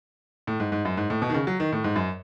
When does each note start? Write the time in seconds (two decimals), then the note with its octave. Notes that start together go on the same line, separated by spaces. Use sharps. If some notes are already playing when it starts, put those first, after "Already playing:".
0.47 A2
0.60 G#2
0.72 G#2
0.85 F#2
0.97 G#2
1.10 A2
1.22 B2
1.30 D#3
1.34 C#3
1.47 F#3
1.60 D#3
1.72 A2
1.84 G#2
1.96 F#2